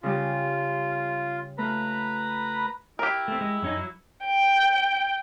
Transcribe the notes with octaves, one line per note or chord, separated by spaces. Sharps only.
C#3 G3 F4 G4
A3 F4 B4 A#5 B5
E4 G4 A#4
A3 C4
G#3
F#2 C#4 D#4
F#3
G5